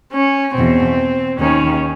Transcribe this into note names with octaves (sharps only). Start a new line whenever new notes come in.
C#4
E2 B2 C4
D#2 D#3 C#4